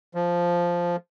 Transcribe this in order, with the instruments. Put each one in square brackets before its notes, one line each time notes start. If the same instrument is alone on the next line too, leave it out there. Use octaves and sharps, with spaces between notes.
[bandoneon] F3